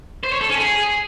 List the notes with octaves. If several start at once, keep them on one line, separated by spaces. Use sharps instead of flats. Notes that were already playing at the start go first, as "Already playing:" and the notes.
C5
C#5
A4
C#4
G#4